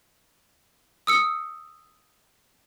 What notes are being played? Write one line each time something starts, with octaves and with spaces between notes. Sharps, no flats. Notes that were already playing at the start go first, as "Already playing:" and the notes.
D#6 E6 C#7